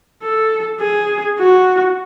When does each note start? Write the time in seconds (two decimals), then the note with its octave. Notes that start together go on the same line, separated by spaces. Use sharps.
0.23 A4
0.81 G#4
1.39 F#4